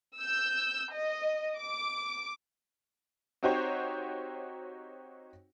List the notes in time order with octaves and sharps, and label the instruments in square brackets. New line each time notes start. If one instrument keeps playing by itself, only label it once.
[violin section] E6 G6
D#5
D6
[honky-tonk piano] C4 D#4 F#4 G4 C5 C#5